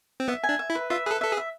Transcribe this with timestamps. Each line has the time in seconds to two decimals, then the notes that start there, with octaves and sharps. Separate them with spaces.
0.20 C4
0.28 B3 E5
0.44 G#5
0.49 D4
0.59 E5
0.70 E4
0.75 B4
0.90 F4 E5
1.06 G#4 B4
1.11 A4
1.21 A4 E5
1.32 G#4
1.37 E5